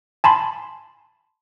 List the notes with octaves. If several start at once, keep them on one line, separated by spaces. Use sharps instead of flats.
G#5 A5 B5 C6